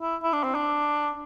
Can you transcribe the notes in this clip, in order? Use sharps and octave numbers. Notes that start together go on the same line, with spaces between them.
E4
E4
D4
C4
D4